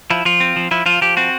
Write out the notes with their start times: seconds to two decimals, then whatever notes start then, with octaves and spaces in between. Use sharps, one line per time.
0.10 F3 E4
0.25 F3 F4
0.40 C4
0.56 F3
0.71 F3 E4
0.86 F3 F4
1.02 F3 G4
1.17 C4 F#4